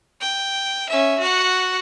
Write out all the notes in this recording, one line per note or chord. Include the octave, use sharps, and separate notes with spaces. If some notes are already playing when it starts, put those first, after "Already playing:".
G5
C#4 E5
F#4 F#5